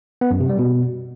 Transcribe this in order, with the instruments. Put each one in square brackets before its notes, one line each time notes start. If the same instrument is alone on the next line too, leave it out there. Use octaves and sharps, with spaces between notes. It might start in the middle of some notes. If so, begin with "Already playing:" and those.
[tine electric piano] B3
F#2
C3
G3
B2